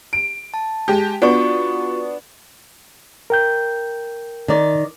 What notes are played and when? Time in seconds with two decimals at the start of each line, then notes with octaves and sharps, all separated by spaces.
0.13 D7
0.54 A5
0.88 G#3 G4
1.22 B3 D4 F4 F#4 C#6
3.30 A#4 G5 G6
4.48 D#3 D5